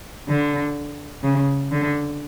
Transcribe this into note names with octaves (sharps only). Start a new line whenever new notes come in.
D3
C#3
D3